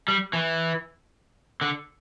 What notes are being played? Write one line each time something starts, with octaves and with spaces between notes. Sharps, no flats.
G3
E3
D3